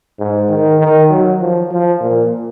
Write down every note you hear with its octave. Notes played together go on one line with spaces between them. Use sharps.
G#2
D#3
D#3
F#3
F3
F3
A#2